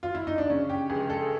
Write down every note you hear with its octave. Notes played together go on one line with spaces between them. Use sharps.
F4
E4
D#4
D4
C#3 C#4
G4
C#2 G#4
A4